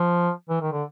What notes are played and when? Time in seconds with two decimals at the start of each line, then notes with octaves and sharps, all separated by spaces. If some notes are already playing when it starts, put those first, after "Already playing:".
Already playing: F3
0.49 E3
0.61 D#3
0.72 D3